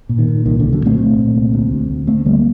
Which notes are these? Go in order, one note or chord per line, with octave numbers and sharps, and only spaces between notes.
A#2
D#3
A#2
C2 D#3
C2 D3
D3 F#3
A#2 A3 C4
A#2
A#2
C2
D2
D2
D2
D3 A3 C4
D3 G3 A#3